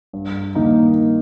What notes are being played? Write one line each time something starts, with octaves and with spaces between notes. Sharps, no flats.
G2
D#3 A#3 D#4